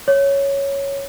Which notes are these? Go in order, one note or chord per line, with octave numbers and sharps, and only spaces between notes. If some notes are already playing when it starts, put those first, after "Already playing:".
C#5